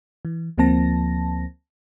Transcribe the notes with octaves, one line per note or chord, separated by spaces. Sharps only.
E3
D2 F3 A#3 C4 A5 A#6